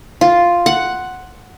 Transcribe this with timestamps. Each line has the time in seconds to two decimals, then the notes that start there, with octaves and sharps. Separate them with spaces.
0.21 F4
0.66 F#5